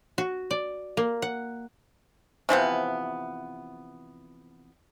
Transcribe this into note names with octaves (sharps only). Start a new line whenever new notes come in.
F#4
D5
A#3
F#5
C3 E3 F3 B3